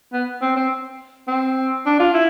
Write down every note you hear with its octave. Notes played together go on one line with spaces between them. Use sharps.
B3
C4
C4
C4
D4
F4
E4